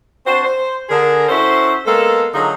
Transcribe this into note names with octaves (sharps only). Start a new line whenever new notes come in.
C4 D4 F#4 C5
C5
D3 G#4 A#4
C#4 E4 F#4 A4 C5
G#3 A#3 B3 A4
D3 F#3 A#3 D#4 F4 G#4